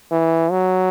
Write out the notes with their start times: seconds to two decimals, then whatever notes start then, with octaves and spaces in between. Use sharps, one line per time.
0.11 E3
0.51 F#3